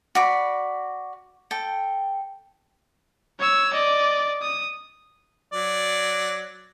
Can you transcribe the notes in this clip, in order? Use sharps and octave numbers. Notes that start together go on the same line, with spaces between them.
F#4 D5 B5
A4 G5
C#5 E6
D5 D#5
D#6
F#3 D5